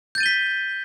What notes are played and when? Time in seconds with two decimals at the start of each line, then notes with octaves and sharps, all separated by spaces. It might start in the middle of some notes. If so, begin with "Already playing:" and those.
0.15 G6
0.18 A6
0.20 D#7
0.23 G7
0.26 B6